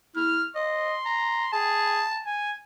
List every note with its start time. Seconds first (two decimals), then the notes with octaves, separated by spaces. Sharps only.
0.16 E4 F6
0.55 D#5 C6
1.06 A#5
1.53 G#4 A5
2.26 G#5